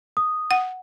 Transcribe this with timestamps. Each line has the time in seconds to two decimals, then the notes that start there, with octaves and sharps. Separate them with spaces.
0.17 D#6
0.51 F#5